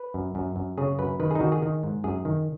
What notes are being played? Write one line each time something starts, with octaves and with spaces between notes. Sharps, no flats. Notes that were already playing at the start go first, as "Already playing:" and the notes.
Already playing: B4
F#2
F#2
F#2
C#3 G#4
F#2 B4
D#3 B4
D#4 G#4
D#3 F#4
G#4
D#3
G#2
F#2 G#4
D#3